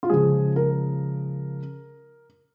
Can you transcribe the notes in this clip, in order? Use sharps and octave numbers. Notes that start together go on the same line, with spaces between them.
F4
C#3 F3 G#3 G#4
A#4